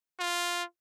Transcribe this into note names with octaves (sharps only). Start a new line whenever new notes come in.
F4